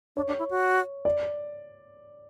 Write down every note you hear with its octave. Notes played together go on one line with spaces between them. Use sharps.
D4 C#5
D4
E4
F#4
D5